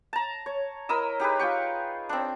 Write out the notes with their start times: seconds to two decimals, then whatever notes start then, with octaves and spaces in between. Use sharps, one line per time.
0.13 A5 A#5
0.46 C#5
0.89 E4 A#4 D#5 E6
1.20 D#4 G4 G#4 B4
1.39 F4 G#4 G5 C#6
2.09 C4 D4